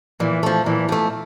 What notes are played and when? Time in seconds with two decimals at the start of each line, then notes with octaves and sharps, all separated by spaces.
0.20 A#2 E3
0.43 F3 A3
0.66 A#2 E3
0.89 F3 A3